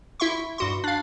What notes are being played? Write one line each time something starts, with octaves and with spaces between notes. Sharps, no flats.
E4 E5 C6 C#6
G2 F#4 C6
D4 F5